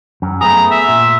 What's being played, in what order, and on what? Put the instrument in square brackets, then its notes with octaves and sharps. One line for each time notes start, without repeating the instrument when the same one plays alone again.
[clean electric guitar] F#2
[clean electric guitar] A3 B3 G#4 [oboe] A#5
[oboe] E5
[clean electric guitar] A#2